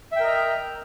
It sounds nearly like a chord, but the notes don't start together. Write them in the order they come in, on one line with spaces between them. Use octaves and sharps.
E5 G5 A#4 D#5 A#5